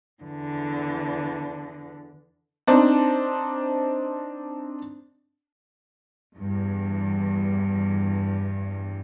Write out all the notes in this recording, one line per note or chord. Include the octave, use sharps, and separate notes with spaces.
E2 D3
C4 D4 D#4
E2 G2